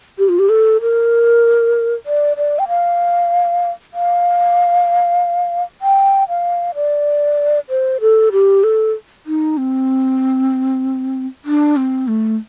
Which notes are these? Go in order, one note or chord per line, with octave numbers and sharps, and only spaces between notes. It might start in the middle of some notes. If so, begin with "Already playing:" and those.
G4
F4
G4
A4
A#4
D5
D5
G5
F5
F5
G5
F5
D5
C5
A4
G4
A4
D#4
C4
D4
C4
A3